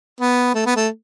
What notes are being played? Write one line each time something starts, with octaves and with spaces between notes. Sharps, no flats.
B3
A3
B3
A3